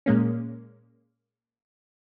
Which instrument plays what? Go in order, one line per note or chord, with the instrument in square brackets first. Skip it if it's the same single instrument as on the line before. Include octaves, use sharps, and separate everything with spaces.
[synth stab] A#2 G#3 A#3 C#4